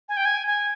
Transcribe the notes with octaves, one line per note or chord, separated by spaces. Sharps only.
G#5
G5
G#5
G#5